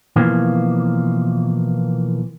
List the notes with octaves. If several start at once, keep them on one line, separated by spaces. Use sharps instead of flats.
B2 E3 F3 A#3